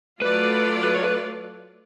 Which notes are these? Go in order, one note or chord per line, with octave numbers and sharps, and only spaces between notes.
F#3 A3 F4 A4 B4 D5
B4
C#5
B4